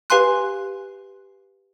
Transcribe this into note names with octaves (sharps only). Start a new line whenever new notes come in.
G4 B4 F5 G#5 C6 F#6